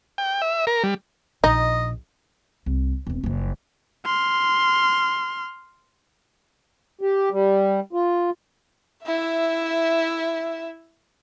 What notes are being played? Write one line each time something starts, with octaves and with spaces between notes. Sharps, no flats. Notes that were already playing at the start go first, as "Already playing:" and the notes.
G5
E5
A#4
G3
A#1 D#4 D#5
C2
E1 C4
F#1 F3
C6 F6
G4
G3
F4
E4 E5